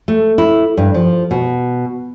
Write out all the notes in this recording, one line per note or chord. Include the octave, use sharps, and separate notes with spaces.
A3
E4
G2
F3
B2